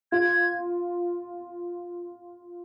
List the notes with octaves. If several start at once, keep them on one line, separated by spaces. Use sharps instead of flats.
F4 G#6